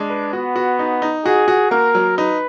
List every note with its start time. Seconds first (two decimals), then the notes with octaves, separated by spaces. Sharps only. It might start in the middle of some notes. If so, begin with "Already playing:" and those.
Already playing: G#3 D4
0.10 B4
0.33 B3 F#4
0.56 F#4
0.79 D#4
1.02 D#4
1.25 F#4 G#4
1.48 F#4
1.71 A#3 A#4
1.95 F#3
2.18 D#4 B4